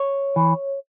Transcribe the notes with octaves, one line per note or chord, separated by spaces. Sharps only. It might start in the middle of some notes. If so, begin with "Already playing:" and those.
Already playing: C#5
E3